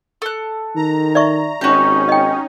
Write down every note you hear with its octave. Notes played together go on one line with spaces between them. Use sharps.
A4 F#6
D#3 A#5
D5 E5 C#6
G#1 C#4 D#4 F#4 G4
D#5 G5